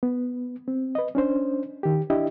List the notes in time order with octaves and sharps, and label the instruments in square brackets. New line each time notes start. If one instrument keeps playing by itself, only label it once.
[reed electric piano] B3
C4
B4 D#5
C#4 D4 C5
D#3 G4
D4 E4 G4 D#5 E5